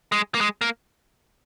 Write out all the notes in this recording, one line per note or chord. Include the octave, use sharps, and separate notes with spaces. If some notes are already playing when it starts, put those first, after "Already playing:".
G#3
A#3
G#3
A#3